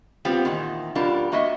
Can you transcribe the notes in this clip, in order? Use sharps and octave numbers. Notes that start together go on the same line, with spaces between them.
G3 B3 C4 F4 G4
E2 A#2 D#3
B2 G3 D4 F4 A#4
G2 A#3 F#4 D#5 E5